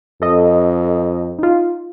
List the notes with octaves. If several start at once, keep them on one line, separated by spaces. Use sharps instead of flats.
F2 A4 D#5
D#4 F4